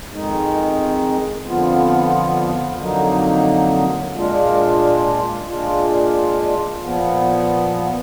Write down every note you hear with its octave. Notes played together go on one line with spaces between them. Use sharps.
F2 D#3 G#3 D#4
F2 D3 F3 B3 F4
F2 D3 F#3 A#3 D#4
A#2 G#3 D4 F4
A#2 G#3 D4 F4
A#2 F3 B3